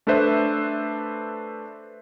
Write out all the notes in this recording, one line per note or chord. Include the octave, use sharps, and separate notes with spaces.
A3 D4 A4 B4 C5 E5